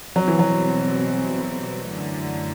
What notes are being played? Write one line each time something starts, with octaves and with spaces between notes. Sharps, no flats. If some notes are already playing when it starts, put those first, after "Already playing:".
B2 F#3 G3 C4
E3
F#3
F#2 D3 A3